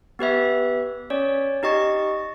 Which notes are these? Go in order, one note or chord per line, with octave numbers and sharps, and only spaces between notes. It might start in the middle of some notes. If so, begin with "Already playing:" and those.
B3 G4 B4 E5
C#4 C#5 D5
D#4 G4 D#5 C#6 A6